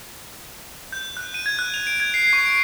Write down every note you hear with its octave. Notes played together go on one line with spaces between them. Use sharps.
G6
F#6
D#7
G#6
F#6
F7
D7
G#6
C7
C#6
D7